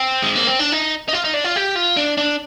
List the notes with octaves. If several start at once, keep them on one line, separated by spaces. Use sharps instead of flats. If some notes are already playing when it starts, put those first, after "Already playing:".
Already playing: C4
G#3
A#3
C4
D4
D#4
D#4
F4
D#4
D4
F4
G4
F4
D4
D4